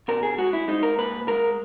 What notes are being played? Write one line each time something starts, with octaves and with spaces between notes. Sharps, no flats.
B2 A#4
G#4
G#3 F#4
E4
G#3 D#4
A#4
A#2 B4
G#3 A#4